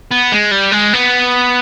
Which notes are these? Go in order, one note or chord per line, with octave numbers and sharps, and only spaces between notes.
B3
G#3
G3
G#3
B3